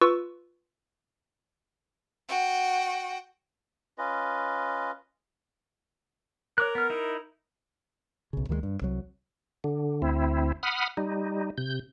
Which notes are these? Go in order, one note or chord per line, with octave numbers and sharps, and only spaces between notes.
F4 B4 C#6 E6
F#4 G5
C#4 F4 B4 D#5
A#4 C#5 D6 F#6
B3 F6
D#4 E4
B1 C#3
D2 D#3 E3 G#3
G2
C2 F#3
D3
D2 C4 E4
F#5 B5 D#6 F6
G3 D#4
C3 G6